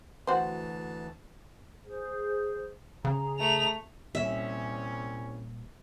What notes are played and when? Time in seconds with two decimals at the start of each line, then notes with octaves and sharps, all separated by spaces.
0.27 D2 E3 F#4 C5 A5
1.85 G#4 C5
3.05 C#3 G#4 A#5
3.39 A3 F7
4.15 C2 A#2 G3 C#4 E5